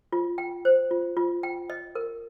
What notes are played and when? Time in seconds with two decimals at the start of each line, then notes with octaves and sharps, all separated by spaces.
0.12 F4
0.38 G5
0.65 C5
0.91 F4
1.17 F4
1.43 G5
1.70 D#5
1.95 A#4